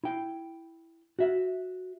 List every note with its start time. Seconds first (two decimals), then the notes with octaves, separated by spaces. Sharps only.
0.04 E4 G5
1.19 F#4 E5